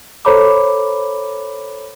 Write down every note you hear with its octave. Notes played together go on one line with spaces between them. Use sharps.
A4 C5 C#5 A#5 B5 D6